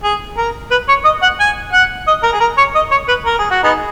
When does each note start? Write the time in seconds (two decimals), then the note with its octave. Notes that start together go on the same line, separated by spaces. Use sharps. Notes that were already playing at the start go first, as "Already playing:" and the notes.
0.04 G#4
0.38 A#4
0.71 B4
0.88 C#5
1.05 D#5
1.22 F#5
1.40 G#5
1.73 F#5
2.08 D#5
2.23 A#4
2.33 G#4
2.40 A#4
2.58 C#5
2.75 D#5
2.91 C#5
3.08 B4
3.26 A#4
3.39 G#4
3.51 F#4
3.63 B3 D#4 G#4